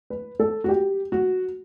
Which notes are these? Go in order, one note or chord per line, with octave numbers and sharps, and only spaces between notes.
B4
A4
F#4
G4
F#4